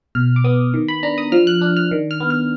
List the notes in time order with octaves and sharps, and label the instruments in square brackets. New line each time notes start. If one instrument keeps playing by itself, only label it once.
[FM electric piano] B2 F6
D6
B3 D#6
D#3
B5
D4 A#5
D#6
F3 F6
F#6
D4
F6
D#3
F6
B3
F6